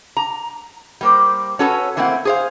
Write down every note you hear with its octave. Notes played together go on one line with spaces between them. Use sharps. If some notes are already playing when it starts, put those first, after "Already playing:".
A#5
G3 A#3 C5
C#4 F#4 A4 B4 C#5
E3 A3 A#3 C4 E4 F#5
G#4 C5 F5